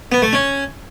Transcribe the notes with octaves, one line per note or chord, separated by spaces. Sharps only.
B3
A3
C#4